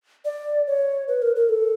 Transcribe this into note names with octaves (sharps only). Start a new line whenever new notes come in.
D5
C#5
B4
A#4
A#4
A4